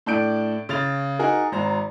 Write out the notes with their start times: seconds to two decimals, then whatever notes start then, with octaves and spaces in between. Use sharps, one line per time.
0.06 A2 D4 G6 D7
0.69 C#3 A6 F7
1.19 D#4 F#4 G#4 A#4
1.52 G#1 C5 A#5